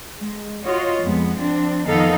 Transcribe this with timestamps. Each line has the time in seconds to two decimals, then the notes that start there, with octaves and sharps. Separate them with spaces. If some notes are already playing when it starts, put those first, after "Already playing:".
0.18 G#3
0.64 F4 F#4 C#5 D#5
1.02 F2 G#3 B3
1.37 F3 C4 D4
1.86 F2 D#3 B3 D#4 A4 F5